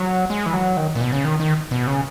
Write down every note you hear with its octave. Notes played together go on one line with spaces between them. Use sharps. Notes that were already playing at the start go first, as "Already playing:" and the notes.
Already playing: F#3
G#3
E3
F#3
D#3
A#2
B2
C#3
D#3
D#3
B2
C#3